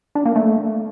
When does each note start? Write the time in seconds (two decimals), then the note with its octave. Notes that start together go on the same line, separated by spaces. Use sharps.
0.15 D4
0.25 A#3
0.36 A3